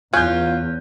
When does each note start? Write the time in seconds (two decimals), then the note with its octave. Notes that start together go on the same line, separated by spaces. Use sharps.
0.14 E2 C#4 F4 F#6 G6